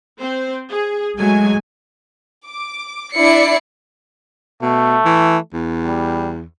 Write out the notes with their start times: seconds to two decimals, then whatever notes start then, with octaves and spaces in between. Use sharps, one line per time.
0.19 C4 C5
0.70 G#4
1.18 F#3 G#3 A3 G#5
2.48 D6
3.13 D4 E4 D5 C7 C#7
4.62 B2 A3
5.05 E3
5.54 E2
5.83 G3